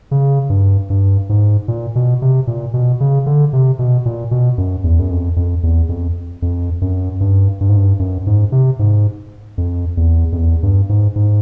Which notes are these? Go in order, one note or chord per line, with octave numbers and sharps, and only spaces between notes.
C#3
G2
G2
G#2
A#2
B2
C3
A#2
B2
C#3
D3
C3
B2
A#2
B2
F#2
E2
F#2
F2
F2
E2
F2
F2
F#2
G2
G2
G#2
G2
F#2
G#2
C3
G#2
F2
E2
F2
E2
G2
G#2
G#2